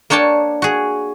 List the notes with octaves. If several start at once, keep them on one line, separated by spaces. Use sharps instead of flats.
A#3 D4 C#5 G5 A5
F#4 G#4